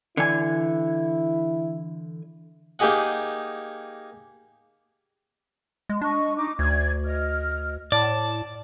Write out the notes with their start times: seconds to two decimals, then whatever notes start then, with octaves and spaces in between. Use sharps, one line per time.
0.17 D3 E3 E4 G#5
2.79 A#3 D#4 G4 G#4 D#5 F#5
5.89 G#3
6.01 D4 D#5 C#6
6.36 D#4 D6
6.59 D2 D5 G#6
7.05 D#5 F6
7.92 A2 D5 A5